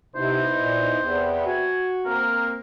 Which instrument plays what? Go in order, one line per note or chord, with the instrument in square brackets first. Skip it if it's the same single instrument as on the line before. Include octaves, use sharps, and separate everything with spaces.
[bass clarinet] C3 [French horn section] B3 D#4 E4 [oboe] C5
[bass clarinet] A#2
[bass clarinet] E2 [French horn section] C3 B3
[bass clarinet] F#4 [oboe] G#5
[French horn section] A#3 C4 [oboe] A#4